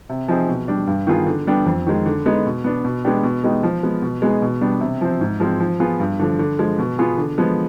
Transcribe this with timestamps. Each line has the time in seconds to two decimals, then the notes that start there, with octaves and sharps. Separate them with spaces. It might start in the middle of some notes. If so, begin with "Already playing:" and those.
0.09 C3
0.28 F3 C4 D#4 G#4
0.48 B2
0.68 G3 D4
0.87 G2
1.07 D#3 B3 F4 G#4
1.27 D3
1.47 G3 B3 D4 G4
1.66 F2
1.86 D#3 G#3
2.06 D3
2.26 G#3 B3 D#4
2.45 B2
2.64 B3 D4
2.85 B2
3.05 G#3 B3 D4 G4
3.23 B2
3.44 G#3 B3 D#4 G4
3.63 F3
3.83 G#3 B3
4.02 B2
4.22 G#3 B3 D#4 G#4
4.42 B2
4.61 G3 B3 D4
4.81 C3
5.01 F3 C4
5.21 G#2
5.40 F3 G#3 C4
5.60 F3
5.80 B3 F4 G#4
6.00 G2
6.20 D3 F3
6.39 D3
6.59 F3 G#3
6.79 B2
6.99 B3 F4 G#4
7.18 D3
7.38 F3 G#3 B3